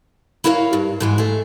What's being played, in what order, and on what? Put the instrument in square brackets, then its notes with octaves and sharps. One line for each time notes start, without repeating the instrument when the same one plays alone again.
[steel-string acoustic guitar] E4 F#4 A#4 C#5 F5
G2
G#2 E3 G#3
A3 G#4